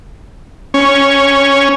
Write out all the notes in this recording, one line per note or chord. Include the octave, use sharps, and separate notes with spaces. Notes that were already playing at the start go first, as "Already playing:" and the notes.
C#4